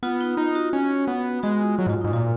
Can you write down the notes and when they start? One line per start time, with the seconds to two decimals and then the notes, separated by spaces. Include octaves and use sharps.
0.03 B3 F4
0.21 D#4
0.37 D#4 F4
0.55 F#4
0.73 C#4
1.07 B3
1.43 G#3 F#4
1.61 F4
1.78 F#3 F4
1.87 G#2
1.90 F4
2.01 D#4
2.04 G#2
2.13 A#2 F4